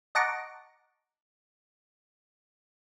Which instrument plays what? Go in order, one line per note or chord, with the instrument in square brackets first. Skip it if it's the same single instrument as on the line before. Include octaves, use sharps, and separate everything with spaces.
[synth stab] D#5 F#5 A5 A#5 C#6 D6